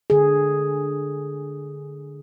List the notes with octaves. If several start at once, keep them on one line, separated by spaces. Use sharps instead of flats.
D3 G#4